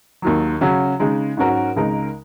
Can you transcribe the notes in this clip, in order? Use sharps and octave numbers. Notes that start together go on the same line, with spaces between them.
D#2 D#3 F#3
C#3 F#3 C#4 F#4
C#3 G#3 D#4
G#2 F#3 C#4 F#4 A#4
C#2 C#3 G#3 D#4 A#4